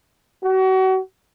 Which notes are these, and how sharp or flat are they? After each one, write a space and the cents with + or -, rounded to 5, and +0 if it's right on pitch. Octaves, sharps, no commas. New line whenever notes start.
F#4 +35